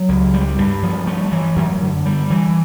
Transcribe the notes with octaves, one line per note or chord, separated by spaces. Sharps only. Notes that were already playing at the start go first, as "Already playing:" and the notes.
Already playing: F#3
C#2
G3
G2
F3
A3
E3
F#2
D3
G3
E3